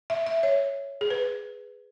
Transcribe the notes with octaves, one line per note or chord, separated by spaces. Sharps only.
E5
E5
C#5
G#4
B4